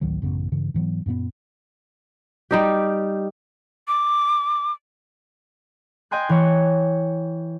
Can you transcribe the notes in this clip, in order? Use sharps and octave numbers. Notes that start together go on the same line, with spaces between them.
A1 D2 D#3 F#3
A1 F#2 C#3 B3
G2 C#3 E3
G#2 E3 F#3 B3
F#2 A#2 A#3 B3
G3 D#4 G4
D6
D#5 G5 G#5 C6 F#6
E3 C#5